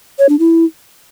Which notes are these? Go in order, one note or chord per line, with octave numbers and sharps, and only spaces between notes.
C#5
D4
E4